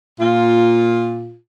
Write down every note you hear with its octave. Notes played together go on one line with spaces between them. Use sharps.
A#2 F4